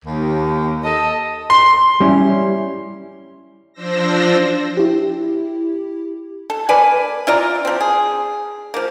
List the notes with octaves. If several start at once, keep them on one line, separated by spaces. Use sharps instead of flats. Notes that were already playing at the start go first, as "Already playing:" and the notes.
D#2
A4 D#5
C6
G3 C#4 E4
F3 D4 C5 E6 A#6
E4 G4
A4
A#3 B4 D5 G#5
E4 F4 D5 A#5
F3 C4
G#4
F3 A#3